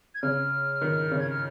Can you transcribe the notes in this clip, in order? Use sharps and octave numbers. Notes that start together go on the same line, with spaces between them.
G#6
C#3 F6
D#3
C#3
G#6
F6